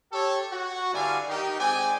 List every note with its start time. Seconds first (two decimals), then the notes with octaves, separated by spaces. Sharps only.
0.11 G4 A4 C#5
0.51 F#4
0.94 G2 D3 E4 D5 F5 G#5
1.29 D#3 D#4 G4
1.59 G#3 C4 D5 G5 G#5